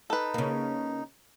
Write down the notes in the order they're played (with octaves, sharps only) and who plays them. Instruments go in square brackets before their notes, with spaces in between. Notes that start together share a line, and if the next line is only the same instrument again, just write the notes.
[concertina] D#4 [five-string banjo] A4 B4
[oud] C#3 A#3